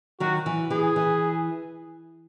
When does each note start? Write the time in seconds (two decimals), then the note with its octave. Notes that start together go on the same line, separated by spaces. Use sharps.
0.20 D#3 F#3 F#4
0.46 E3
0.70 E3 G#4
0.96 E3